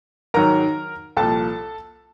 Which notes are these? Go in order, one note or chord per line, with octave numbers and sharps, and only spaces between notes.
G#2 D#3 F#3 A#4 A#5
C2 A#2 F3 A4 A5